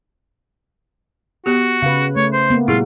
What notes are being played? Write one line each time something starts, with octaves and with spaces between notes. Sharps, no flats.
B3 F#4 G4
C#3 B4 F5
A3 C#5
C5
A#3 B3
A#2 G3 E4 F4 G#4